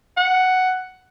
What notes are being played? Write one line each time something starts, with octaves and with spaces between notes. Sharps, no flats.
F#5